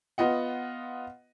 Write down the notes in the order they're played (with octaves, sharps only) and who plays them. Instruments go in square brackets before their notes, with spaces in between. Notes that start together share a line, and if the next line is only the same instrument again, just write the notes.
[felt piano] B3 F4 D#5 F#5